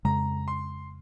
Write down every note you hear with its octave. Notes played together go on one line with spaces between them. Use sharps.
F2 C#3 G#3 A#5
C6